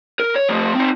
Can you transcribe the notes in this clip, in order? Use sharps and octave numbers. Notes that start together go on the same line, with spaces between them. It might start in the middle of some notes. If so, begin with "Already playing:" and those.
A#4
C#5
F3 A3
C4 D#4